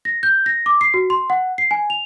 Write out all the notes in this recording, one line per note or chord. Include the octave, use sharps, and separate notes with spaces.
A#6
G6
A#6
D6
C7
F#4
C6
F#5
C7
G#5
F7